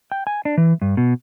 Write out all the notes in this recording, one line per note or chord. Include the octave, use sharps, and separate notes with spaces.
G5
G#5
D4
E3
G2
B2